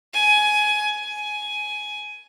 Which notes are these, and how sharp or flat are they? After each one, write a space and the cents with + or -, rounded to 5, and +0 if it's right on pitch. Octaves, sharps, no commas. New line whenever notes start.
G#5 +20
G#5 +15